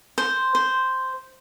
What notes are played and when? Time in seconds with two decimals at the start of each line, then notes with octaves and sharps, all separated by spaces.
0.18 C5
0.55 C5